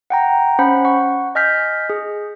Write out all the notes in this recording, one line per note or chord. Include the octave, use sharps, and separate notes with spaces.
F#5 G5 A#5
C#4 C5 F#5 B5
F#5 C#6
D#5 G#5 F6 G6 B6
G#4